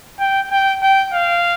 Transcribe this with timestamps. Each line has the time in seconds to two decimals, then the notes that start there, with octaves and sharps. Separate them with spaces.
0.20 G5
0.51 G5
0.83 G5
1.13 F5